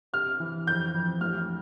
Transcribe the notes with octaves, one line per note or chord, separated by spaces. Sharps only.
C3 F6
E3
F2 G6
F2
A1 F6